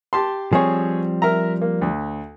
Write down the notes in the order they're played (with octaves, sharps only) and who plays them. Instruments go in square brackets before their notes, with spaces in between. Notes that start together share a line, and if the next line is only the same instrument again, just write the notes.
[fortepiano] G4 A5 C6
[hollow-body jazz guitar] F3 G3 C4 [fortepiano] G#4 C#5
[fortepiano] A#4 E5 A#5
A#3
D2